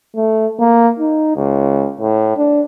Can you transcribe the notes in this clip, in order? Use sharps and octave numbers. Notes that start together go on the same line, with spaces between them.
A3
A#3
D#4
C#2
A2
D4